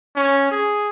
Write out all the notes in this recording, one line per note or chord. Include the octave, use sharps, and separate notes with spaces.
C#4
G#4